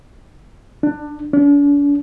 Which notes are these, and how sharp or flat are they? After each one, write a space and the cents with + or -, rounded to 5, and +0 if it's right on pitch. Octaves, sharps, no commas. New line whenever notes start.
D4 +20
D4 -45